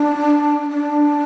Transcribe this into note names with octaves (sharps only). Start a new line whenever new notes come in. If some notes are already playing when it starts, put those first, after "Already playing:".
Already playing: D4
D4